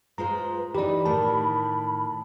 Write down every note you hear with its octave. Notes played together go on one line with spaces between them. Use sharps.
G#3 F4 B4 C5 A#5
E3 D#4 G4 D5 B5
A2 D#3 A3 A5